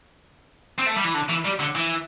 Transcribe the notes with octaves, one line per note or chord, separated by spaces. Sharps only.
C4
A3
G3
E3
D3
E3
G3
D3
E3